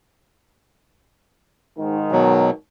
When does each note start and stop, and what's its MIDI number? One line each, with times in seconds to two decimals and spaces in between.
1.78 2.50 44
1.78 2.50 51
2.12 2.50 47
2.12 2.50 54